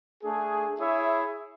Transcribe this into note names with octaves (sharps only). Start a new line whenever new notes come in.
A3 D4 G#4
E4 G#4 C#5 E5